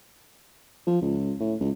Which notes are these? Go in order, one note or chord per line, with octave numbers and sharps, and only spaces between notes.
F3
C#2
A2
C#2